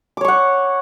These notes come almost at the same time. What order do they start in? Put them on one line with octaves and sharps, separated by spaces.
D6 C#5 C#6 F#5